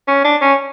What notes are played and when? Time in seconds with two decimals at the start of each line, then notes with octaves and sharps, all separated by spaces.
0.08 C#4
0.24 D4
0.41 C#4